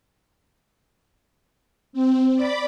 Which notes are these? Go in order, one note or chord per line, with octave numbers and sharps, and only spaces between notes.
C4
D5 B5 D6